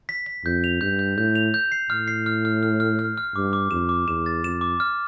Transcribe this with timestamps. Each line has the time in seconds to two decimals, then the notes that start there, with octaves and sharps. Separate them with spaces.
0.09 B6
0.26 B6
0.44 F2 G6
0.64 F7
0.81 G2 G6
0.99 G6
1.18 A2 G6
1.35 F7
1.54 G6
1.72 C7
1.90 A2 F6
2.08 C7
2.26 F6
2.45 F6
2.63 F6
2.80 F6
2.99 F6
3.17 F6
3.35 G2 D6
3.53 D6
3.71 F2 E7
3.89 D6
4.08 E2 E7
4.26 A6
4.43 F2 E7
4.61 D6
4.80 F6